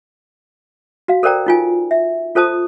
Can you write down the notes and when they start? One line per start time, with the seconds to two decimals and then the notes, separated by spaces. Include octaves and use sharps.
1.08 F#4 F5
1.23 A4 A#4 C5 D5 G5 A#5
1.47 D#4 F4 G#5
1.91 E5
2.35 F4 A4 C5 A5 D#6